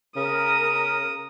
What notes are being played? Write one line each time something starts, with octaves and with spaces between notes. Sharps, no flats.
C#3 A#4 D#6